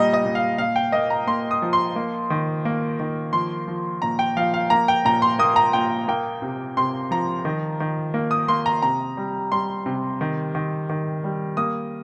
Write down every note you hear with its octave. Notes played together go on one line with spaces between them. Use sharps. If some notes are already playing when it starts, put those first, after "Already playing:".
Already playing: A#2 G3 D#5 A#5
D#5
A#2
F5
A#2 F5
G5
A#3 D#5
A#5
A#3 C6
D#6
F3
C6
A#3
D#3
A#3
D#3
F3 C6
F3
A#2 A#5
G5
F3 F5
F5
A#3 A#5
G5
A#2 A#5
C6
A#3 D#6
A#5
A#2 G5
A#3 G5
C3
C3 C6
F3 A#5
D#3
D#3
A#3
D#6
A#3 C6
A#5
C3 A#5
G3
G3 C6
C3
D#3
D#3
D#3
G3
A#3 D#6